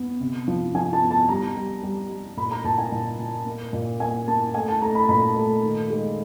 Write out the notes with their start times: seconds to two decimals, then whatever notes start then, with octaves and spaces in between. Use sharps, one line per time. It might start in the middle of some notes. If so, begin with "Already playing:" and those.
Already playing: B3
0.21 C3
0.48 F3
0.74 F3 G#5
0.93 A5
1.02 B3
1.11 A5
1.29 G3 A#5
1.56 G3
1.83 G3
2.10 G3
2.37 A#2 B5
2.51 A#5
2.64 A#2 A5
2.78 G#5
2.92 A#2
3.19 A#2
3.46 A#3
3.73 A#2
4.00 A#3 G#5
4.28 A#3 A5
4.54 A3 G#5
4.68 A5
4.81 A3 A#5
4.95 B5
5.09 A#2 B5
5.36 A3
5.63 D#3
5.90 G#3